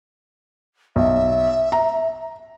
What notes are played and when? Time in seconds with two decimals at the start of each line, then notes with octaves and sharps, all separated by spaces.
0.96 B1 E5
1.72 A#5